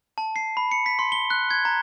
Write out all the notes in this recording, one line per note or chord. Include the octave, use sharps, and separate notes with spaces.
A5
C7
B5
C#7
B6
C6
G7
F#6
G#6
A#5